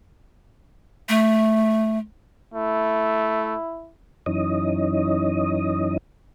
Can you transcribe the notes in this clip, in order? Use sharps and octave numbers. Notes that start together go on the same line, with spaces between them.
A3
A3 E4
F#2 E3 C#4 D#4 D#5